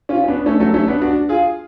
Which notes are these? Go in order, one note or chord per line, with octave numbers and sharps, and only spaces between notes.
C#4 F4
C#4
B3 D4
A3 C#4
F#3 A3
A3 C#4
B3 D4
D4 F#4
F4 G#4